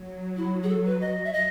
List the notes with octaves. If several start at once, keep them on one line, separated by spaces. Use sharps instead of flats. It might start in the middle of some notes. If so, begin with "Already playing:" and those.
Already playing: F#3
E4
G#4
A4
B4
D#5
E5
D#5